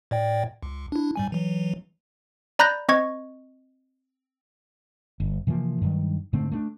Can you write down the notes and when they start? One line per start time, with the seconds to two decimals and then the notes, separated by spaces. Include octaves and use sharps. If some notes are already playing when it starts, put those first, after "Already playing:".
0.11 A2 D5 G5
0.63 C#2
0.92 D4 E4
1.16 G#2 G3 G#5
1.32 E3 F#3
2.59 D5 A#5 B5 F#6 G6 A#6
2.89 C4 D#5 C#6 G#6
5.20 G1
5.47 C3 E3 F3 A#3
5.82 G2 D#3 F#3
6.33 G#2 D3 A3 C4
6.52 A3 A#3 D4